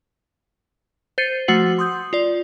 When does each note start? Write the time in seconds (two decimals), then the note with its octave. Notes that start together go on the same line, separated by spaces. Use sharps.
1.18 C5 G6 A6 C7 C#7 D#7
1.48 F3 A3 F#4 F#5 C7 F#7
1.78 C6 D#6 G6
2.13 F4 D5